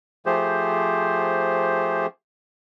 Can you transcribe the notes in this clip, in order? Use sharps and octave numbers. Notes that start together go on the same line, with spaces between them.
F3 A3 G4 G#4 C5